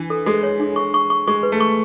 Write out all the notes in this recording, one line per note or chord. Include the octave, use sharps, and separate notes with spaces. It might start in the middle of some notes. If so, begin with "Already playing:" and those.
Already playing: E3 D4
A4
G#3 A4
C#5
D4
C#6
C#6
C#6
G#3 C#6
B4
A3
C#6